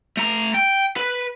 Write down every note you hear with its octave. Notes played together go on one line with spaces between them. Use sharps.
A3 A#5
G5
B4